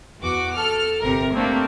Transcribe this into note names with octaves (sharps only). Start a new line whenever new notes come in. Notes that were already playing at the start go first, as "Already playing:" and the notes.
E2 F#4 D6
A4 F6
G1 C3 A#4
A3 A#3 C4 D4